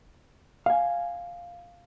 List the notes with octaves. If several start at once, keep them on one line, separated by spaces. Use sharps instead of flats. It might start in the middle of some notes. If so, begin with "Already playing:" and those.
F5 G#5